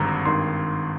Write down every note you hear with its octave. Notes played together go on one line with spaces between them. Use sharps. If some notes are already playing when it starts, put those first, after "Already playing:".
Already playing: G#1 G2 D3 A#5
G#1 G2 D#3 C6